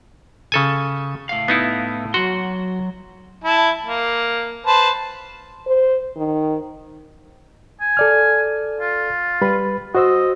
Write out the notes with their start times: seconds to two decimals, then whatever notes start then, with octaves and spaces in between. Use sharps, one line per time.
0.52 C#3 A4 G#5
1.29 A2 F5
1.48 B3 D#4 E4
2.14 F#3 F#4 C6
3.44 E4 A5
3.86 A#3
4.66 B4 C5 A5
5.66 C5
6.17 D#3
7.81 G#5
7.97 A4 D5 F6
8.80 F4
9.42 G3 B4 B5
9.95 F#4 C5 D#5 E6